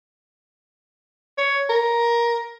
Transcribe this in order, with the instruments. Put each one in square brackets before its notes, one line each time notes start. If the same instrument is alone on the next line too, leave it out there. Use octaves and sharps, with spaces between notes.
[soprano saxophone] C#5
A#4